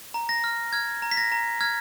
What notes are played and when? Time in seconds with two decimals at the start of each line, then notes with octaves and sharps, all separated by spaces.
0.14 A#5
0.29 A#6
0.44 F6
0.73 F6 G#6
1.02 A#5
1.11 B6
1.17 A#6
1.32 A#5
1.61 F6 G#6